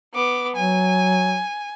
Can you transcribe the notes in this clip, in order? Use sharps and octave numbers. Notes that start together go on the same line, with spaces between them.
B3 D6
F#3 G#5